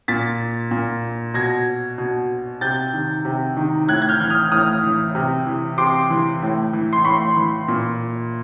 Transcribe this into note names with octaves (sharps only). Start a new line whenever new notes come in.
A#2 A6 B6
A#2
B2 G#6 A#6
B2
C3 G6 A6
D#3
C3
D#3
A2 F#6 G#6
G#6
F6 G6
E3
D#6 F6
A2 D#6 F6
E3
C3
E3
C3 C6 D6
E3
A2
E3
C6
A2 B5 C#6
E3
A#2